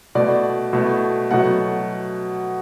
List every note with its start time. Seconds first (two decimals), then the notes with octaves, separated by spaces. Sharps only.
0.15 B2 A3 D5
0.73 B2 A3
1.31 B2 F#3 A3 F#5